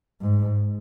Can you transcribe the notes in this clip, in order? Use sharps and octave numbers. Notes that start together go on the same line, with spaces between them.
G#2